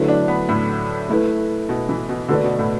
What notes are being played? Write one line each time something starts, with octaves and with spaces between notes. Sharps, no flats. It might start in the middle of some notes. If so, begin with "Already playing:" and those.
Already playing: D3 F#3 A3 E4 B4
D4
B3
A2
A3 E4 B4
B2
E3
B2
D3 A3 F#4 B4 D5
B2
A2